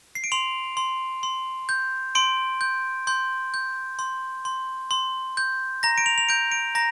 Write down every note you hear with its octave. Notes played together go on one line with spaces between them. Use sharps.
C7
D7
C6 F7
C6
C6
G6
C6 D7
G6
C6 G6
G6
C6
C6
C6
G6
A#5 A#6
D7
F7
F7
G6 D7
D7
A#5 A#6